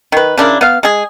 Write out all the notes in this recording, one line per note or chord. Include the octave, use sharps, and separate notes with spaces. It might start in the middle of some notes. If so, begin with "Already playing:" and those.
D#3 B4
C#3 D4 E4 A#4
B3 F5
G#3 G#4